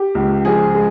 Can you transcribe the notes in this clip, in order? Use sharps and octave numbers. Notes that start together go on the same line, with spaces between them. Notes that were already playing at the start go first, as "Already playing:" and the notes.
Already playing: G4
C#2
F3 G#4
G#3